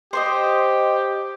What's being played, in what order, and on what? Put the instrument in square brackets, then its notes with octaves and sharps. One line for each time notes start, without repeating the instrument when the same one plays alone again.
[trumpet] G4 [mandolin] C5 C#5 D#5